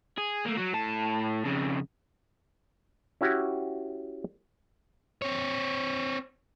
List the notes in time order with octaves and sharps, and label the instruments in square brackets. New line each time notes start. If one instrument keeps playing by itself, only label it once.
[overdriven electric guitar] G#4
A3 A#3
F#3 F#4
A2 A5
F2 C#3
[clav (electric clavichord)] C#4 E4 F#4 G4
[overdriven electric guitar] C4 C#5